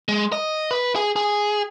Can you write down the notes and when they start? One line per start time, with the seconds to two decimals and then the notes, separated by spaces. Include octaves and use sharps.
0.09 G#3
0.32 D#5
0.71 B4
0.96 G#4
1.16 G#4